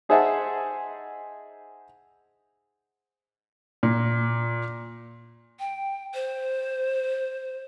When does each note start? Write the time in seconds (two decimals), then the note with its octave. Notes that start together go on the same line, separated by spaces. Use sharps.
0.09 D#4 G#4 C5 E5 F#5 A5
3.83 A#2
5.59 G5
6.14 C5